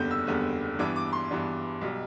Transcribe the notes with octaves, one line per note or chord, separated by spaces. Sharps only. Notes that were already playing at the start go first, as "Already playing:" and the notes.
Already playing: F#1 E2 D3 G3 B3 G6
E6
F#1 E2 D3 G3 B3
G2 E3 B3 D4 D6
D6
C6
G2 E3 B3 D4
B1 B2 G3